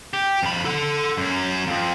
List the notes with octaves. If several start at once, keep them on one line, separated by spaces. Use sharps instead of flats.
G4
F2 B5
A4 F#5
F#2 C#4
F2 F3